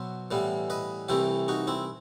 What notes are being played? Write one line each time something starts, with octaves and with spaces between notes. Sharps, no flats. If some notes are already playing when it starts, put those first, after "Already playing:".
Already playing: B2 F#3 B3 C5 E5
A2 E3 G3 B3
B4 D#5
C2 C3 E3 A3 E4 G4
D#4 F#4
C4 E4